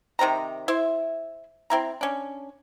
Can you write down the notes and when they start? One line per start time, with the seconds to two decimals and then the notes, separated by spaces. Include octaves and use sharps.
0.19 C3 D#3 C5 A#5
0.68 E4 C5 E5
1.70 C4 E4 A#5
2.01 C#4 D4